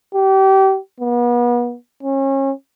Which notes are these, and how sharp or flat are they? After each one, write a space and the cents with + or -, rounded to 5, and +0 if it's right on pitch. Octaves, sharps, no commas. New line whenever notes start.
G4 -30
B3 -35
C#4 -30